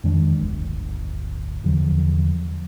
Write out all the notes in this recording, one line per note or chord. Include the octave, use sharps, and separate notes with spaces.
F2 D#3 G#3 D4
D1 G1
E2 D3 F3 F#3